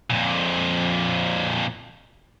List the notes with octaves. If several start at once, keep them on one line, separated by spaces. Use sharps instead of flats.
F2 A#2